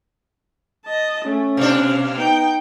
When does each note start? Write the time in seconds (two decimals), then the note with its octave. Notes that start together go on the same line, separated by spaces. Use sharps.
0.85 D#5 A5
1.25 A3 C#4
1.57 B2 D4 F5
2.17 B3 D#4 G5